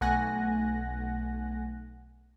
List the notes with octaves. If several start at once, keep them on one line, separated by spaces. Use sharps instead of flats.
B1 A3 F#5 G#5 F#6 A#6